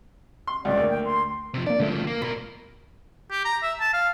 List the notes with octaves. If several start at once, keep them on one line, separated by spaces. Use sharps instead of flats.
C6
C#2 G2 D5
D2 A#3
G5
C6
C3 F3
A#3 D4 D5
G2 D3 F3 A3
A#3
B2 A#4 B5
G4
A#5
E5
A5
F5